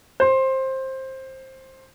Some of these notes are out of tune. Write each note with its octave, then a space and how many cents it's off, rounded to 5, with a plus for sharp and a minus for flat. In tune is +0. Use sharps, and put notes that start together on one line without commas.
C5 +15